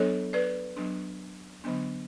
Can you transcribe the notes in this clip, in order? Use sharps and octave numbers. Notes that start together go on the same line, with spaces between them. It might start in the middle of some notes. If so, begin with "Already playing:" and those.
Already playing: F#3 B3 D4 A4 C#5
B4 D5
F#3 B3 D4
D3 F#3 B3 D4